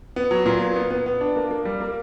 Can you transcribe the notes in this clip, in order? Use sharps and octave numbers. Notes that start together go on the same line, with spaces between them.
B3
F#3
A#2
B3
B3
B3
B3
D4
A#3
A#3
G3
A#3